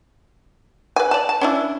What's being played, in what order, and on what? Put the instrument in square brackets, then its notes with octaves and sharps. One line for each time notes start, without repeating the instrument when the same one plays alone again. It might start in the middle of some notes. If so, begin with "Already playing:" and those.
[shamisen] B4 G#5
D5 A5
A5
C#4 D4 E4